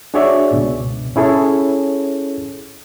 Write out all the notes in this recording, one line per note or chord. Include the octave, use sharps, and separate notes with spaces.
D4 F#4 G#4 C#5 D5 E5
C#2 G#2 B2
C#4 E4 G#4 A4 C#5